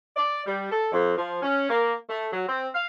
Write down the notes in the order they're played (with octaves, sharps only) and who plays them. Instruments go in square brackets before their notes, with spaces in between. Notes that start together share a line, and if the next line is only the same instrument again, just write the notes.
[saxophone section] D5
G3
A4
F2
F3
C#4
A#3
A3
F#3
C4
F5